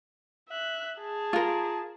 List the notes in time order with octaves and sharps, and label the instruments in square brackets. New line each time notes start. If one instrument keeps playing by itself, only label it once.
[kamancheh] E5 F#6
G#4 A5
[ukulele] F4 A#4